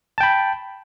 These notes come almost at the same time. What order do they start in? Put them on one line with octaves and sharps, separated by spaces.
A5 G5 B5